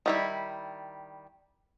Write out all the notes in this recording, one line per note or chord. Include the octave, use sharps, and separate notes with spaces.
D#3 G3 E4